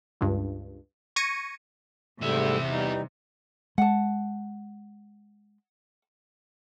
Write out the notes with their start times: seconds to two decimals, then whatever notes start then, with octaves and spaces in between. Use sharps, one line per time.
0.21 C#2 G2
1.16 C#6 G#6 A#6 C#7 D#7
2.21 E2 G#2 C3 G3 A3 E5
2.70 E3 G3 D#4
3.78 G#3 F#5 A5